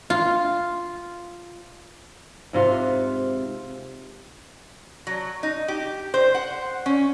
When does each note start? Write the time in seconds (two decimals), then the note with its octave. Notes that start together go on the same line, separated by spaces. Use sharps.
0.10 F4
2.53 G#2 C3 F4 F#5
5.07 F#3
5.43 D#4
5.68 G4
6.14 C5
6.35 F#5
6.86 C#4